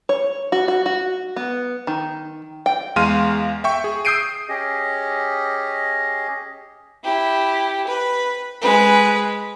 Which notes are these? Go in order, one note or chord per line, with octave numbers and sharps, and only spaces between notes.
C#5
F#4
F#4
F#4
B3
D#3
G5
E2 G#3 F5 C6 F6 D#7
E5 G5 C#6
G#4
D#6 E6 G6 C7 D7 D#7
C#4 G4 G#4 D#5
E4 G4
B4
G#3 B4